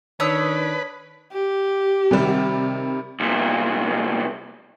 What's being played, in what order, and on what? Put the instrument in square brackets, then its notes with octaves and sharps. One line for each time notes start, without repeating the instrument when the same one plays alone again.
[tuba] D#3 [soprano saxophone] D4 [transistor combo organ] B4 [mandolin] C#5 D#6 E6
[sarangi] G4
[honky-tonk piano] C3 D#3 G3
[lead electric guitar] C2 A#2